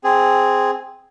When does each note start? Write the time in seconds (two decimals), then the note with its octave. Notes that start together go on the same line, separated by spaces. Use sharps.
0.04 C4 G#4